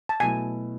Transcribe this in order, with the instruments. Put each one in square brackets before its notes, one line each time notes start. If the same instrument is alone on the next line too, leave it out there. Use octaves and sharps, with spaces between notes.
[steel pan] A5
[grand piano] B2 F#3 A3 E4 [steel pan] G#5